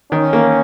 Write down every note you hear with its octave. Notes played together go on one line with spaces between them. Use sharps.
D#3 C#4
A#3